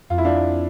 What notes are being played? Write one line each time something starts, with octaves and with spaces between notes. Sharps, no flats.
F2 F4
E4
D4 F4